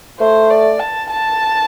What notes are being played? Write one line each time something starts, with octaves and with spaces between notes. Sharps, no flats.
A3 C5
D5
A5
A5